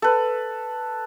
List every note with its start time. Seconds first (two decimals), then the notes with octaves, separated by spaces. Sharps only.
0.02 A4 B4